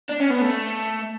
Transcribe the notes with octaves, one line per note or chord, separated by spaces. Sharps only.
D4
C#4
B3
A3